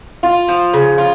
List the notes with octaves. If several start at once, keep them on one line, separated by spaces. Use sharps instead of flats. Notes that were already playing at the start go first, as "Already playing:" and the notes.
F4
F3
C#3
F4